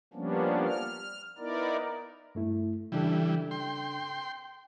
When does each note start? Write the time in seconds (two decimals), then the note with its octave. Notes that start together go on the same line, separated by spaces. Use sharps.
0.14 F3 G3 A#3 B3 C#4 D4
0.67 F6
1.38 B3 D#4 E4 A#4 D5
2.35 G2 A3 E4
2.92 C#3 E3 G3 D4 A4
3.51 G5 C6